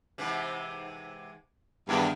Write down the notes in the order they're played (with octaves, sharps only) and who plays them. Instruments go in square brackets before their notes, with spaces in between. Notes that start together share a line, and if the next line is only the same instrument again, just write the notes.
[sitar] G#2 C3 E3
[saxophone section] E2 G2 [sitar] D#3 E3 A#3